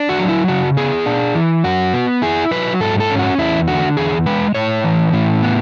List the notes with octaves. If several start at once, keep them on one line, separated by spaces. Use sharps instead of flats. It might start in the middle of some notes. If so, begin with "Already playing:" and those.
Already playing: D4
F#4
F#3
E4
C#3 F#4
B3 G#4
D4
E3
F#2 F#4
B3
E4 G#4
F#3 B4
G#2 A4
A4
C#4
F#4
E2 E4
D3 F#4
E2 G#4
G#3 B4
A2 C#5
E3
A2
B3